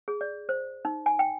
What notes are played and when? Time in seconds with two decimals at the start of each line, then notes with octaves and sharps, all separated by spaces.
0.08 G#4
0.21 D5
0.49 C5
0.85 D#4
1.06 G#5
1.19 G5